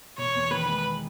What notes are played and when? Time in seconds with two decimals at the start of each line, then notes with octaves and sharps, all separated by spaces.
0.18 E1 C#5
0.35 E2
0.51 D#3 B4
0.68 G#3